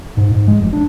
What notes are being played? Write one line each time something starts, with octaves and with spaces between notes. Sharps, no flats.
G#2
G#2
G#3
F1
D4